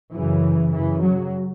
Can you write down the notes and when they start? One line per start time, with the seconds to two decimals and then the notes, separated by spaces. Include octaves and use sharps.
0.14 F#2 C#3 E3
0.73 F#2 C#3 E3
1.03 F#3